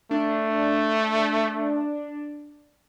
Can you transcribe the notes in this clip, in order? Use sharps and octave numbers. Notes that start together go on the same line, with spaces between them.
A3 D4